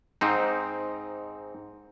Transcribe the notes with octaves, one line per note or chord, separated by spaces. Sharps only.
G#2 C4 D#4